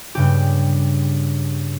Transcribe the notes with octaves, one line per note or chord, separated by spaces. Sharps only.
G2 C#3 G4